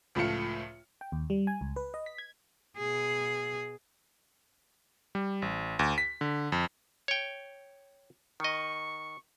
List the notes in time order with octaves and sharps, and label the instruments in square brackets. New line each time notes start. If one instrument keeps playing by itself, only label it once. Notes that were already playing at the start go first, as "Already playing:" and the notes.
[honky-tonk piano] C#2 A2 F3 A3 F4 C#7
[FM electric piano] G5
D#2
G3
G#5
C#2
B4
D#5
B6
G#6
[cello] B2 G#4
[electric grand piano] G3
A1
D2
B6
D3
F2
[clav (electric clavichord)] C#5 G5
[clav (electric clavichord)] D#3 D#5 [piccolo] C#6